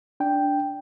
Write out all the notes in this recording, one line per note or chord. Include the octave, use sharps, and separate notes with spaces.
D4 G5